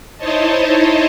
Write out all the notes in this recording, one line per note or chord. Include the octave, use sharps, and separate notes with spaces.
D#4 E4 C5 C#5 D#5 A5